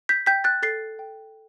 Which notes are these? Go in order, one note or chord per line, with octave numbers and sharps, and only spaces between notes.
G6 B6
G5 G6 B6
F#6 A6
A4 A6 C7
G5